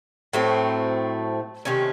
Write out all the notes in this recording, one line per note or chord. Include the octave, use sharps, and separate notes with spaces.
A2 F#3 A3 C4
C3 D#3 A3 C#4